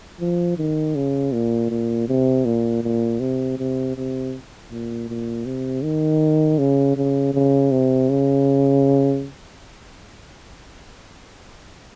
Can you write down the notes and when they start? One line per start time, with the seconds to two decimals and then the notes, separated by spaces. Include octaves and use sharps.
0.21 F3
0.57 D#3
0.96 C#3
1.34 A#2
1.70 A#2
2.09 C3
2.45 A#2
2.84 A#2
3.20 C3
3.58 C3
3.97 C3
4.71 A#2
5.09 A#2
5.46 C3
5.84 D#3
6.59 C#3
6.97 C#3
7.34 C#3
7.72 C3
8.10 C#3